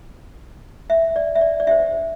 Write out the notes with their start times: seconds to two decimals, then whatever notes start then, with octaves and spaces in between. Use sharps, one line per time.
0.90 E5
1.16 D5
1.36 E5
1.41 D5
1.60 D5
1.67 D4 G4 C5 E5